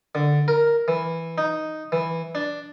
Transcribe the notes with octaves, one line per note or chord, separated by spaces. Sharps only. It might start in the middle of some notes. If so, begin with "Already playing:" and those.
D3
A#4
E3
D#4
E3
D4